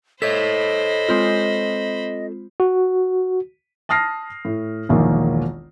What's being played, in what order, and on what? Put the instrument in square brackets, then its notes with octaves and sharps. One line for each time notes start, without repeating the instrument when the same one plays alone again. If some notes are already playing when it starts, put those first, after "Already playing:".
[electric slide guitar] A4 C#5 [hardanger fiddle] C5 B5 [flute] D#5 [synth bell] B6
[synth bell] G#3 C4 F4
[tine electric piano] F#4
[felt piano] A5 D#6 F6 A#6 C7
A2
E1 A#1 D#3 A#3